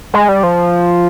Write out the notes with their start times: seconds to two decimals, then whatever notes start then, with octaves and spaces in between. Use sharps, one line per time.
0.14 G#3
0.29 G3
0.43 F3